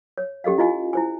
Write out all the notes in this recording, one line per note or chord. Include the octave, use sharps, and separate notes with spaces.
C#5
C#4 G4 A4 D#5 F5
E4 F4 D#5 F5 G#5
E4 C5 G#5